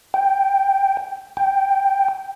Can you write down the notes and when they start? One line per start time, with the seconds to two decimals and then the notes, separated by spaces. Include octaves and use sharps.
0.14 G5
1.37 G5